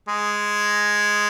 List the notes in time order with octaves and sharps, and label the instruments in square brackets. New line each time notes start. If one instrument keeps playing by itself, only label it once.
[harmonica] G#3